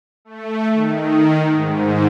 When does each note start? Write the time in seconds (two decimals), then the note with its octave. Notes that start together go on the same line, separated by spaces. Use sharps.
0.25 A3
0.71 D#3
1.51 G#2